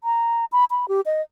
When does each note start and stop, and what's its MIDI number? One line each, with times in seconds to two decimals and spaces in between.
0.04 0.45 82
0.52 0.65 83
0.71 0.88 83
0.88 1.01 67
1.06 1.22 75